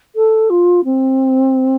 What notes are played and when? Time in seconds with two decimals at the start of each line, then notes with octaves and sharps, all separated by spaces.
0.16 A4
0.50 F4
0.85 C4